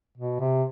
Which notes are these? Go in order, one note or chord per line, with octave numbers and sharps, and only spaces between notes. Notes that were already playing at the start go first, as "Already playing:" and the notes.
B2
C3